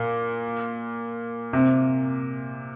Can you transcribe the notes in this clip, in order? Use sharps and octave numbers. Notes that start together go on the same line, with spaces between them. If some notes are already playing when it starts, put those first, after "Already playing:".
Already playing: A#2
C3